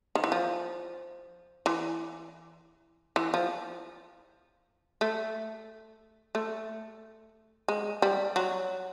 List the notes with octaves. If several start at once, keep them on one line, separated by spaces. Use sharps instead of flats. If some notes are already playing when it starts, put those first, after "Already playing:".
D#3
E3
F3
E3
E3
F3
A3
A3
G#3
G3
F#3